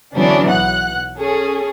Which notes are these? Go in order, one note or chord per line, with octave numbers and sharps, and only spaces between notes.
D3 E3 F#3 B3 C#4 D4
B1 F#5 F#6
C#4 G#4 A4